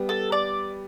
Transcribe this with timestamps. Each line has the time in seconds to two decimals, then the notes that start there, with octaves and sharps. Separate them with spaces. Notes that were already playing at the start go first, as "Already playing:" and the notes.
Already playing: G3 B3
0.09 A4
0.32 D5